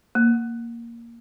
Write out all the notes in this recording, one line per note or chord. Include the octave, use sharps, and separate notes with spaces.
A#3